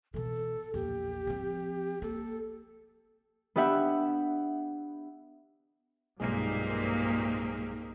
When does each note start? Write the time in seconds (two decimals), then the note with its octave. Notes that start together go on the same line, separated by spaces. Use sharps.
0.14 B2 E3 A4
0.74 A#1 E2 G4
1.27 F3 C4
2.02 A#3 A4
3.56 B3 D4 G4 E5 F#5
6.20 B1 G2 A#2 G#3 A#3 C4 D#4 G#4